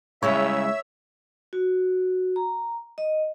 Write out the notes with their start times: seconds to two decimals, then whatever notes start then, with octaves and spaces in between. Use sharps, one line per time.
0.23 C#3 G3 G#3 E4 C#5 E5
1.53 F#4
2.36 A#5
2.98 D#5